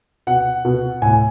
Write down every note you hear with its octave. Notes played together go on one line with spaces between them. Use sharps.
B2 F#5
B2
A2 G#5